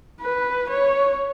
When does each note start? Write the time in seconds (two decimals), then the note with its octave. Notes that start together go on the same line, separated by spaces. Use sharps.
0.21 B4
0.70 C#5